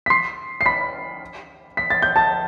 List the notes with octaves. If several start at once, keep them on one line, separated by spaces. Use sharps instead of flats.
B6
C6 C7
C7
B5 B6
B6
A6
G6
A5 A6